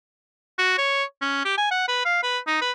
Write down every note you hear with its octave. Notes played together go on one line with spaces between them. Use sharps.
F#4
C#5
C#4
G4
G#5
F#5
B4
F5
B4
D#4
B4